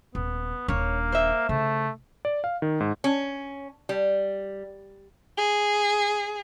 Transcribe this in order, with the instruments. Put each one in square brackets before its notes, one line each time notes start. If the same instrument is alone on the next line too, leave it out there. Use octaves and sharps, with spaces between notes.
[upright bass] D#1 [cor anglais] B3
[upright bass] D#1 D4 [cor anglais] A#3 [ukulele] C#5
[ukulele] C5 E5
[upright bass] C#3 [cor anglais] A3
[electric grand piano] D5
F5
D#3
G#2
[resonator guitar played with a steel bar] C#4
G3
[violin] G#4